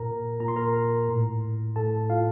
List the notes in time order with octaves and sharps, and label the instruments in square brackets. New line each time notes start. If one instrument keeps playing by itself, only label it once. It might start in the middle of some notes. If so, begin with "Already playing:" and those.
Already playing: [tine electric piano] A#2 A#4 A#5
A#2 A#5
C6
A#4 A#5
A2
A2 A4 A5
F4 F5